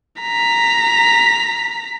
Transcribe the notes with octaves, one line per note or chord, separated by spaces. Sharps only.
A#5 B6